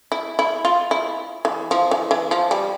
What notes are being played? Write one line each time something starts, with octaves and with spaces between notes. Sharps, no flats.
E4
E4
F4
E4
E3
F3
E3
E3
F3
G3